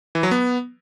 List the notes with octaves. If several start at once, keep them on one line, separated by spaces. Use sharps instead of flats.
E3
F#3
B3